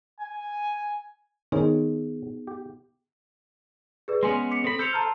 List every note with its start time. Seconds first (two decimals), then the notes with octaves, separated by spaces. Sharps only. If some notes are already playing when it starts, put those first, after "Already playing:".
0.21 G#5
1.52 D#3 B3 C#4 D#4 G#4 C5
2.47 G4
4.08 G#4 B4 D5
4.23 G#3 B3 C#4 G#5 C6
4.51 D6 B6 C#7
4.64 C4 A4 B5
4.79 A4 C5 G6 C#7 F7
4.93 A5 A#5 F6